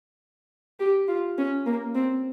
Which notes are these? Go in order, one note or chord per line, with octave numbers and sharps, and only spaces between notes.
G4
F4
C#4
A#3
C4